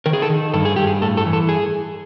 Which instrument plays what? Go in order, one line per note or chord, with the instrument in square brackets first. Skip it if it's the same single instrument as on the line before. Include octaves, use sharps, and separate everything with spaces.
[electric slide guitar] D#3 A#4
G#4
A4
D#3
G2 A4
G#4
G2 G4
G#4
A2 A4
A4
E3
A4
G#4